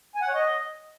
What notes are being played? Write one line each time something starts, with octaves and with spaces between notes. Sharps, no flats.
G#5
F#5
C#5
D#5